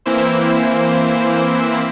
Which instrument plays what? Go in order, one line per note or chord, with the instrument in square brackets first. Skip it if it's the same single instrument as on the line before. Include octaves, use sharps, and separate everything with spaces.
[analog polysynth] E3 A#3 C4 E4 C5